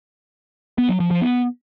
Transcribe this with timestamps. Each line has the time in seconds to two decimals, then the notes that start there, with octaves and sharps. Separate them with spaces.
0.78 B3
0.89 F#3
1.00 F3
1.11 F3
1.22 B3